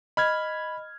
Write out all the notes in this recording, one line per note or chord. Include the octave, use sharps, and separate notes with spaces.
D#5 B5 F6 G#6